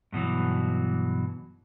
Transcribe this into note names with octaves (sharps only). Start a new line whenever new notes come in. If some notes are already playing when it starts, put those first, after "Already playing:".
G2 B2 E3 F#3